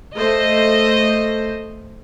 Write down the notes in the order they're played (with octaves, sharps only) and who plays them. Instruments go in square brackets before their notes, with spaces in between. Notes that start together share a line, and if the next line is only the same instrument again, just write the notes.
[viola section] A3 C5 [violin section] D#5